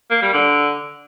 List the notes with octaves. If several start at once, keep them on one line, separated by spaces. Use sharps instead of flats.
A#3
G3
D3